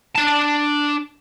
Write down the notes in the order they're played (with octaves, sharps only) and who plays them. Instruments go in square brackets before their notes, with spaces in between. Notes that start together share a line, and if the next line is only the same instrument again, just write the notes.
[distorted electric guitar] D4 A5